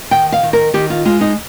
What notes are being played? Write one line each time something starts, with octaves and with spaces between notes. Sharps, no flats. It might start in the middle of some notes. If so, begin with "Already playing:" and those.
D#3 G5
F5
D#3
A#4
D#3 G4
F4
G#3 F4
D#4